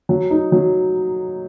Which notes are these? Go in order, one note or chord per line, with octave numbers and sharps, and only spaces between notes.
F#3
D#4
F#3